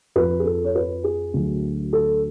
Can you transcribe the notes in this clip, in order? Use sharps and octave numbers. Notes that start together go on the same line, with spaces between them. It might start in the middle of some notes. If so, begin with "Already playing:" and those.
F2 F3 B4
G#4
A4
C#5
B4
G#4
D2 D3 F#3
A4